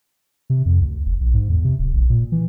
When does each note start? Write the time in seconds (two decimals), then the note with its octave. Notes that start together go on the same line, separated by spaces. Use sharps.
0.50 C3
0.65 F2
0.81 D2
1.06 F1
1.21 A#1
1.34 G#2
1.50 E2
1.64 C3
1.79 D1
1.94 A#1
2.10 A#2
2.32 E3